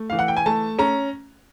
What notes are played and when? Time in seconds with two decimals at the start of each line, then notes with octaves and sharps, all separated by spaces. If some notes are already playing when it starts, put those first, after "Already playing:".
Already playing: A3
0.10 E3 F5
0.19 F#5
0.28 G5
0.37 G#5
0.46 A3 A5
0.79 C#4 A#5